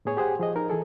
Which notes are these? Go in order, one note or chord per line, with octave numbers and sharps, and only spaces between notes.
A2 B3 G#4 C#5
G4 G#4 C5 F#5
F3 G#4 D#5
D#4 A#4
E3 G#4 A4